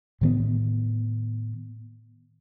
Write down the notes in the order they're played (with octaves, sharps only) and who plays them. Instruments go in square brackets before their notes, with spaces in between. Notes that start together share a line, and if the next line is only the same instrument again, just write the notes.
[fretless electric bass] A2 D#3 B3